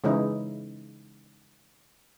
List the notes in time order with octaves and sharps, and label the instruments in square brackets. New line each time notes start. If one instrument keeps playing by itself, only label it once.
[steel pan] C#3 E3 G#3 D#4 E4